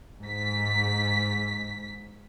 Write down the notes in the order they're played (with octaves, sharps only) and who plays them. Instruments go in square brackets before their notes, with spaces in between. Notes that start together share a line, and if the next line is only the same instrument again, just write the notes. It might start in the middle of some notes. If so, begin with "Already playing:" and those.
[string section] G#2 B6